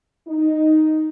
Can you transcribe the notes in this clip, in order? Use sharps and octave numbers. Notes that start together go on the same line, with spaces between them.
D#4